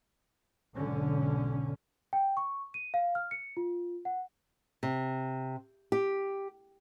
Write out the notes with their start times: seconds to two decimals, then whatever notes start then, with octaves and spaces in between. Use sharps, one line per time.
0.74 B1 G#2 D3 C#4
2.13 G5
2.37 C#6
2.74 D#7
2.94 F5
3.15 F6
3.31 C#7
3.57 F4
4.05 F#5
4.83 C3
5.92 G4